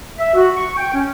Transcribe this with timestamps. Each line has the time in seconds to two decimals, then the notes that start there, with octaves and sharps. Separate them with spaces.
0.18 E5
0.34 F#4
0.56 C#6
0.77 G5
0.94 C#4